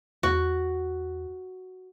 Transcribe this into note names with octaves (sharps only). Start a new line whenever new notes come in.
E2 F#4